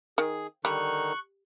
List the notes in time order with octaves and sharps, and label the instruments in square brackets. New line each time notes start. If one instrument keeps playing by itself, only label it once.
[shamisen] D#3 [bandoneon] G#4
[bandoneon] D3 D#3 D#4 [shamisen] G3 [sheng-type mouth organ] C#6 F#6